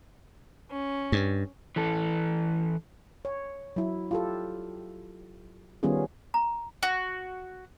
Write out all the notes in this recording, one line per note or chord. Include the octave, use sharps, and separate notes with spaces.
C#4
G2
E3 A4
C#5
F#3 E4
F4 G4 A4
D#3 G3 B3 C#4 F4 G#4
A#5
F#4